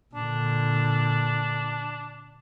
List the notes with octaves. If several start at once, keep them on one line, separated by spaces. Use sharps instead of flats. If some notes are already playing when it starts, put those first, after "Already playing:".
A#2 D3 D4